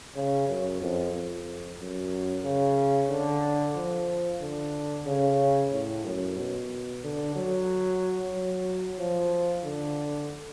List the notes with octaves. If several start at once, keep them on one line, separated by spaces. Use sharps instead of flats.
C#3
F#2
F2
F2
F#2
C#3
D3
F3
D3
C#3
A2
F#2
B2
D3
F#3
F#3
F3
D3